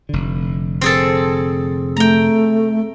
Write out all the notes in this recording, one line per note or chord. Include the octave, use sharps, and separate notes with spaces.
F1 D3
C4 G#4 A4
A3 G5 A#5